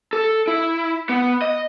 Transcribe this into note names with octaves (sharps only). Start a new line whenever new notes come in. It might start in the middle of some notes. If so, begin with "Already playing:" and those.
A4
E4
B3
D#5